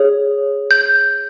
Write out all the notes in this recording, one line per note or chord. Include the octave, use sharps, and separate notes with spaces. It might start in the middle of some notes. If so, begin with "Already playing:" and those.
Already playing: G#4 C#5
G6